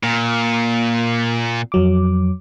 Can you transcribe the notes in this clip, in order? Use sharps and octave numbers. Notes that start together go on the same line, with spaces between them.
A#2
F2 F#3 D6